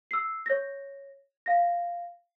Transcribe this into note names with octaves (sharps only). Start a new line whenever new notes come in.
E6 C7
C#5 A#6
F5 A#6